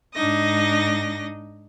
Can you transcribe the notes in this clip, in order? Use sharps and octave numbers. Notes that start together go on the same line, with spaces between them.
G#2 D4 D#4 D#5 A#6